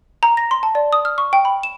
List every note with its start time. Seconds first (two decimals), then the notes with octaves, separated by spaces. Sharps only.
0.23 A#5
0.37 A#6
0.51 C6
0.63 A5
0.75 D5
0.93 D#6
1.05 F6
1.18 C#6
1.33 G5
1.45 B5
1.63 E7